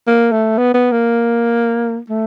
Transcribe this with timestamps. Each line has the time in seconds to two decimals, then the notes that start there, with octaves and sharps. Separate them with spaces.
0.07 A#3
0.32 A3
0.58 B3
0.74 B3
0.92 A#3
2.10 A3